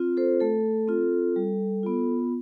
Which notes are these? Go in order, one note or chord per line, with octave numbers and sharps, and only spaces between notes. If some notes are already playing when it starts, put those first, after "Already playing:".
Already playing: C4 F4
A4 C5
A3 A4
C4 F4
G3
B3 F4